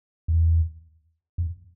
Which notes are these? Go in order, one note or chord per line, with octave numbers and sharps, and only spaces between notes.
E2
F2